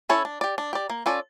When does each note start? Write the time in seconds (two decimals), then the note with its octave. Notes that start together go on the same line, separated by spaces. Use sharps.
0.09 C#4 E4 A4 C#5
0.25 D4
0.41 G4 D5
0.58 D4
0.73 G4 D5
0.90 A#3
1.06 C#4 F4 A4 D5